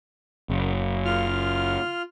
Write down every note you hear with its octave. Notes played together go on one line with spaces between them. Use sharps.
F#1
F4 F6